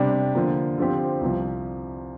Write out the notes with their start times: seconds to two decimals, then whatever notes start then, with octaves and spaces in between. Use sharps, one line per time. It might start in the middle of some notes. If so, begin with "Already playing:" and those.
Already playing: C3 G3 D4 G4
0.35 D3 F3 A#3
0.78 D3 F3 C4 G4
1.21 C2 C3 F3